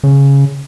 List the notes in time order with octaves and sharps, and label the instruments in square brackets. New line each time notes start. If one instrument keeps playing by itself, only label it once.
[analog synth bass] C#3